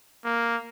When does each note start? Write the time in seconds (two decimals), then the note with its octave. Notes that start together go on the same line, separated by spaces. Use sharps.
0.24 A#3